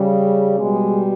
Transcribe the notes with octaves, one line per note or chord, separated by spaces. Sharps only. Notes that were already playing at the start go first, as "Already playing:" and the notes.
Already playing: C#3 G3
B2 G3 G#3